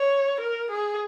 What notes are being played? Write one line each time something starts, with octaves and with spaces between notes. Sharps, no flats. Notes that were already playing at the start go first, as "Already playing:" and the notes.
Already playing: C#5
A#4
G#4